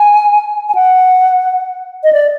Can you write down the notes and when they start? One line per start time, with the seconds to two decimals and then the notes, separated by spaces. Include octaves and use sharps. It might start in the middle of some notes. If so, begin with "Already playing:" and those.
Already playing: G#5
0.69 G#5
0.75 F#5
2.03 D#5
2.13 D5